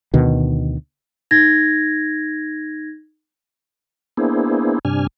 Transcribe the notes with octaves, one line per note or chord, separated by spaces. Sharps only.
D2 B2 D#3
D#4 G#6 A#6
A#3 B3 D4 E4 G#4 C5
G2 C3 D4 G#5 F6